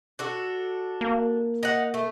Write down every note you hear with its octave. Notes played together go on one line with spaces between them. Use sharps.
D4 F#4 A4
A#3
D#4 F#5
A3